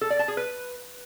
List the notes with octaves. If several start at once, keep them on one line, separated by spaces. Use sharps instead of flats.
A4
D5
A5
G#4
B4